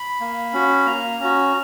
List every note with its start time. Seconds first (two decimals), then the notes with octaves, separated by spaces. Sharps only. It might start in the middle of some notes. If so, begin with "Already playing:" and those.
Already playing: B5
0.20 A#3
0.53 C#4 F#4
0.86 A#3 A#5
1.19 C#4
1.24 F#4